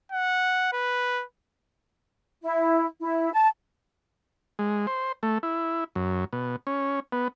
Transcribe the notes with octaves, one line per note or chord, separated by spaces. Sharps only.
F#5
B4
E4
E4
A5
G#3
C5
A3
E4
F#2
B2
C#4
B3